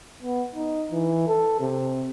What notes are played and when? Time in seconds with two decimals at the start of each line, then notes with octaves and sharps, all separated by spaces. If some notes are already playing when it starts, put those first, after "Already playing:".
0.22 B3
0.55 D#4
0.92 E3
1.28 A4
1.60 C3